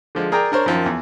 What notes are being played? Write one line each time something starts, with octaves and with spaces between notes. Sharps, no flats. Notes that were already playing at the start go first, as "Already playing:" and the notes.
D3 F3 G#3
G#4 A#4 D5 G5 A#5
D4 A#4 C5 C#5
F#2 D#3 F3
E2